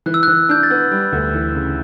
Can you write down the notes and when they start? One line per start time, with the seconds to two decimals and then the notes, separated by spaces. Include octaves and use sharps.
0.06 E3 F#6
0.14 E6
0.23 F#6
0.28 E3
0.49 D4 G6
0.63 A6
0.70 B3
0.92 G3
1.13 D2
1.34 E3
1.55 C#3